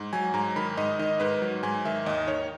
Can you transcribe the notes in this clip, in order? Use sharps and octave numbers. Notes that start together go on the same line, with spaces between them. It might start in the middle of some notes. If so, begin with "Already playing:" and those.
Already playing: G#2
F#3 G#5
G#2 A#5
D#3 B5
G#2 D#5
D#3 D#5
G#2 B4
F#3
G#2 G#5
D#3 E5
D#2 D#5
D#3 C#5